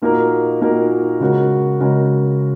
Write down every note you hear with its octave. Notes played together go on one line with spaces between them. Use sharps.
A#2 A#3 D#4 F#4 A#4
A#2 A#3 D#4 F#4 A#4
C#3 G#3 F#4 A#4
C#3 G#3 F#4 A#4